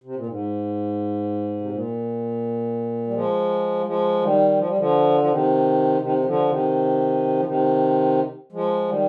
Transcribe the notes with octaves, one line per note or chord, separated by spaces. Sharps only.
C3
A#2
G#2
C3
A#2
G3
F3 G#3
F3 G#3
D#3 G3
F3
G3
D3 F3
F3
C3 D#3
C3 D#3
D#3
D3 F3
C3 D#3
F3
C3 D#3
F3 G#3
D#3 G3